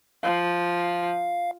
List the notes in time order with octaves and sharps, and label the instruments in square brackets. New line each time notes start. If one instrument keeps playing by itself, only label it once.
[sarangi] F3 [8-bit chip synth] F5